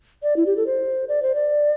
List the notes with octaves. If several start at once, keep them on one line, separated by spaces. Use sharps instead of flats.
D5
E4
G4
A4
C5
D5
C5
D5